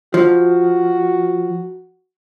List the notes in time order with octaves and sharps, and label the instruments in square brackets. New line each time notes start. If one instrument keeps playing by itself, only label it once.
[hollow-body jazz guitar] F3 [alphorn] F#4